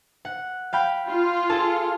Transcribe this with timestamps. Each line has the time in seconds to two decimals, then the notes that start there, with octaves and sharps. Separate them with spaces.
0.25 F#5
0.73 F5 G5 B5
1.08 F4
1.49 G#4 A4 A5